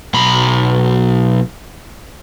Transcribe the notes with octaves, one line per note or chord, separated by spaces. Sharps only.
B1 B5